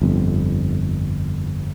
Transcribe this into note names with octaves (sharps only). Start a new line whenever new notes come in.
G1 F2